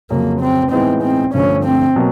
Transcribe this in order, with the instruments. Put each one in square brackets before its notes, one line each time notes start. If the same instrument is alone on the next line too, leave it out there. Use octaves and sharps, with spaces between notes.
[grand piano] F2 C#3 F#3 [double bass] A#3
[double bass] C4
[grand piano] A2 E3 G#3 B3 D#4 [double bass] C4
[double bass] C4
[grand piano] G2 D3 F3 A3 [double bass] C#4
[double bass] C4
[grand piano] B2 F#3 A#3